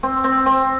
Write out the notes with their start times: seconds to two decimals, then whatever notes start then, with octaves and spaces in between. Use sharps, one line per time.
0.03 C4
0.24 C4
0.46 C4